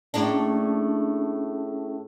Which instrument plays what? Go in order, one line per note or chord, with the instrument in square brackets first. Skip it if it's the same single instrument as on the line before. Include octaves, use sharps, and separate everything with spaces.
[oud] A2 A#3 D4 [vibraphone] C#4 G#4 A5